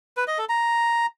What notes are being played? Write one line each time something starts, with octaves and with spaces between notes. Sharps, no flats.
B4
D#5
A4
A#5